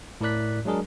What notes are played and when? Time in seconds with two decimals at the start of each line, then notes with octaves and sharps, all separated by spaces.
0.21 A2 E4 A#4 D5 F#6 B6
0.65 F#3 G#3 D4 G#4 A#4